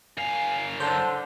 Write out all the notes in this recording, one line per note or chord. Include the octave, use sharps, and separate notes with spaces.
F#2 F5 G#5
D3 C5 A5 C6 G6